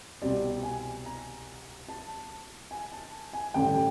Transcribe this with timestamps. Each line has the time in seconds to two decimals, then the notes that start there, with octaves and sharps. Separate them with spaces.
0.22 C2 B2 G3 C4 D5
0.63 G#5
1.06 A#5
1.89 A5
2.71 G#5
2.92 A5
3.33 G#5
3.54 A1 G2 D3 G5